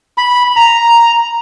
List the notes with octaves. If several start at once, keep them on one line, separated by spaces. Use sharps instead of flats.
B5
A#5